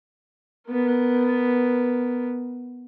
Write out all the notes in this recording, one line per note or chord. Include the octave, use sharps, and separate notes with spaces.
B3 A#4